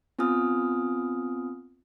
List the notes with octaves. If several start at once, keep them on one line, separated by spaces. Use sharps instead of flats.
B3 C4 F4 G#5 D#6 F6